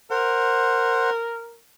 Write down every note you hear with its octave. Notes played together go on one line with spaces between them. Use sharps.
A#4 C5 F#5